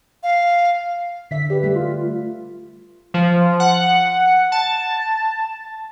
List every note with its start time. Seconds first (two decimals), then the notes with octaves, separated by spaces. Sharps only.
0.23 F5
1.31 D3 E5 B6
1.50 G4 B4 D5
1.63 G3 A3
1.75 F4
3.14 F3
3.60 F#5
4.52 A5